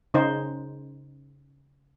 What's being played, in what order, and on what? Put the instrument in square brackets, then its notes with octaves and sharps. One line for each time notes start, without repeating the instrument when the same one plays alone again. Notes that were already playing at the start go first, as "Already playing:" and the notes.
[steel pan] C#3 D#4 C5